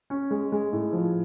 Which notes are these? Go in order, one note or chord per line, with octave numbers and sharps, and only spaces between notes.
C#4
G#3
G#3
A2
F3